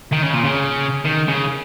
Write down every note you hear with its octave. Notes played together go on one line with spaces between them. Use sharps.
D#3
C#3
A#2
C#3
D#3
C#3